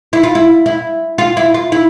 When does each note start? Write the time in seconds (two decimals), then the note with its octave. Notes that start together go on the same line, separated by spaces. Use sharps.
0.13 E4
0.23 F4
0.35 E4
0.66 E4
1.18 F4
1.37 E4
1.54 F4
1.72 E4